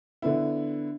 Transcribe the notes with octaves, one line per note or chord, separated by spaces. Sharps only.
D3 B3 E4